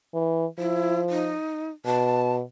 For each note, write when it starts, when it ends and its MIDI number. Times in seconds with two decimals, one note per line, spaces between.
0.14 0.46 52
0.59 1.35 53
0.59 0.98 64
1.10 1.70 63
1.86 2.42 47
1.86 2.34 81